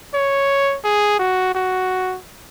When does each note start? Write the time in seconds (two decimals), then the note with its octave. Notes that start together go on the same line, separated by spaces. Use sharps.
0.14 C#5
0.84 G#4
1.19 F#4
1.55 F#4